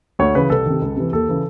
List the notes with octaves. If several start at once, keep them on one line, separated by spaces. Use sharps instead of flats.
D2 C#5
C#3 E3 B4
C2 A4
C3 D#3
C#2
C3 E3
D#2 A4
C#3 E3